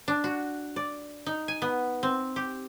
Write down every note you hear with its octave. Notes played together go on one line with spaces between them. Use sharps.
D4
F#4
D5
D#4
G#5
B3
C4
G4